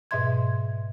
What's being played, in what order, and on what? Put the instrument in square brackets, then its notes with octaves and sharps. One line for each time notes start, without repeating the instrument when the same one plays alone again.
[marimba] G#2 B2 D#5 E5 C6 G#6